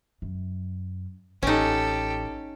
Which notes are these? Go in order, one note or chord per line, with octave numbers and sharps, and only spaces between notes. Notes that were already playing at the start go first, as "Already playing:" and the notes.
F#2
A1 C#4 D#4 G4 A4